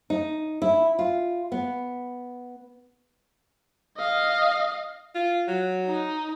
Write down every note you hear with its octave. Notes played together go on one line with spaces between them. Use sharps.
D#4
E4
F4
B3
D#5 F5
F4
F#3
D#4